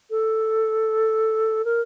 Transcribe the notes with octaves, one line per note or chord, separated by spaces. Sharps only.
A4
A#4